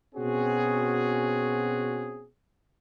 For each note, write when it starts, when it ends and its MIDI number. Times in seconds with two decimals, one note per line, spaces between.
0.15 2.26 47
0.15 2.26 60
0.15 2.26 61
0.15 2.26 66
0.15 2.26 68